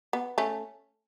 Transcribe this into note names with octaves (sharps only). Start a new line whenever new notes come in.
B3
A3 C#4